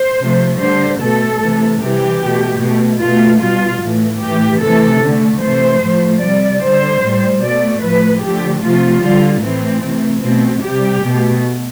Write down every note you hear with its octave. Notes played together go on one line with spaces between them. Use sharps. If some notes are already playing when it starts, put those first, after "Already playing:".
Already playing: C5
C3 F3 A3
D3 G3 C5
B2 A3 A4
C3 E3 A3
C3 E3 G3 G4
B2 A3
B2 A3
B2 A3 F4
B2 G3 F4
A2 E3 A3
A2 E3 A3 G4
C3 E3 A3 A4
D3 A3
C3 E3 A3 C5
A2 F3 A3
C3 G3 D5
D3 G3 C5
A2 G3
B2 A3 D5
A2 F3 A3 B4
D3 F3 A3 G4
C3 F3 A3 F4
D3 G3 F4
A2 E3 A3 C4
C3 E3 A3
B2 A3 C4
C3 G3 G4
B2 A3